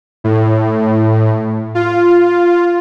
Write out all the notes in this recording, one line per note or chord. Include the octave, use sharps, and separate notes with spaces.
A2
F4